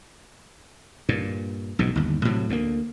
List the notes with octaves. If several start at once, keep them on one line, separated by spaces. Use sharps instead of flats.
G2 A#2
B1 G#2 B2
G1 D#2
A2 C3 F#3
D2 F#3 A#3